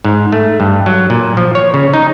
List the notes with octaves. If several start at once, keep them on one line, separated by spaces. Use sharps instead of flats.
G#2
A3
G2
F#3
A#2
F3
C#5
C#3
D#4